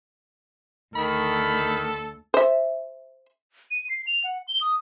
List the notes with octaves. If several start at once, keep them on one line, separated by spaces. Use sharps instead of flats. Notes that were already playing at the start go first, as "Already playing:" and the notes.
D2 D#3 A4 B5
C5 E5
D#7
C7
F7
F#5
G7
D#6